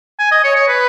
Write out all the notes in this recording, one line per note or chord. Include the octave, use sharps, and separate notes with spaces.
G#5
D#5
C#5
C#5
B4